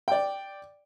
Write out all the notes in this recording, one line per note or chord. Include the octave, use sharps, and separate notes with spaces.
D5 G5